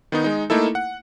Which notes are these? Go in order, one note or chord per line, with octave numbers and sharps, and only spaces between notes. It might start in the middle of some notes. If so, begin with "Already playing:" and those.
D#3 B3 D#4
G#3 D#4
A3 A#3 D#4 E4 A4
F#5